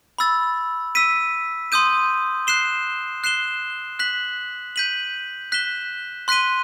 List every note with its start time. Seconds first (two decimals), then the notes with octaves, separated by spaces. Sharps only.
0.19 B5 E6 A6
0.95 E6 B6 D#7
1.72 C6 D#6 G6 D#7
2.47 F#6 C7 E7 G7
3.24 F#6 C7 E7 G7
3.99 F#6 B6 F#7
4.76 G6 B6 D#7 F#7
5.52 F#6 B6 E7 G7
6.28 C6 F#6 B6 D#7 G7